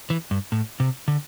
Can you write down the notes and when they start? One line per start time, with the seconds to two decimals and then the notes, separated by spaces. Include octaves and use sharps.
0.10 E3
0.31 G2
0.52 A2
0.80 C3
1.08 D3